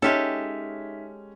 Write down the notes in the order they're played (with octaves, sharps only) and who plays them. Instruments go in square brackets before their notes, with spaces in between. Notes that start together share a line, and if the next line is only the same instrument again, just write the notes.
[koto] G#3 G4 A4 [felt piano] C#4 F6 [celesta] D#4 E5 B6